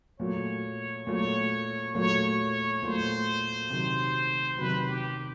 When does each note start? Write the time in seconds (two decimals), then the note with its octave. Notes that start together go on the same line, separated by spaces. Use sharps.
0.19 A#2 F#3 A3 C#5
1.07 A#2 F#3 A3 C#5
1.95 A#2 F#3 A3 C#5
2.39 C#5
2.83 A#2 F#3 A3 C5
3.70 C3 D#3 F#3
4.58 C3 D#3 F#3 B4
4.88 G4